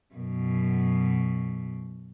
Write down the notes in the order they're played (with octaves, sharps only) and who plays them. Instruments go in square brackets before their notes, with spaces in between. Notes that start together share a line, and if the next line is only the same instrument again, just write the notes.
[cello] F#2 B2